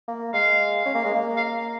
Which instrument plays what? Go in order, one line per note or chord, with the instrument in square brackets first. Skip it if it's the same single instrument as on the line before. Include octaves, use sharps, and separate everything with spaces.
[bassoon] A#3
[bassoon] G#3 [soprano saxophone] F5
[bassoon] C#4
A#3
G#3
A#3
[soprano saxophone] F5